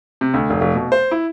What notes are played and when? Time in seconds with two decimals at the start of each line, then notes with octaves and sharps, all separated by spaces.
0.21 C3
0.34 D2
0.50 F1
0.61 F1
0.75 B2
0.92 C5
1.11 E4